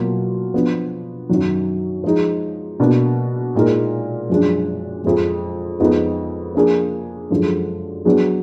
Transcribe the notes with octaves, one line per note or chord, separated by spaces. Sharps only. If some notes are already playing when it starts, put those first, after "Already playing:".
Already playing: B2 F#3 A#3 F4
F3 B3 D4
F#2 D#3 F#3
F3 G#3 D#4
B2 A#3 D4
A#2 G#3 D#4 A#4
F#2 F3 G#3 D4
F2 F3 G#3
F2 F3 G#3 B3 D#4
F3 A#3 D4 G#4
F#2 D3 F3 G#3
F#3 B3 D4 G#4